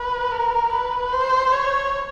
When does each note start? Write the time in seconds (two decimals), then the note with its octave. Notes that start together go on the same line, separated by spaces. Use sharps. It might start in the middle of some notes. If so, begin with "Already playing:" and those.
Already playing: B4
0.32 A#4
0.72 B4
1.12 C5
1.52 C#5